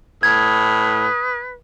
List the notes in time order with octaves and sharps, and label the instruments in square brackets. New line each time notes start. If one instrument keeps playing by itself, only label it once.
[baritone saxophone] A2 [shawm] B4 [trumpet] D#6 [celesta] G#6